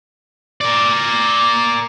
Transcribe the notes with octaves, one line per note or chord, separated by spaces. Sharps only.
A#4 D5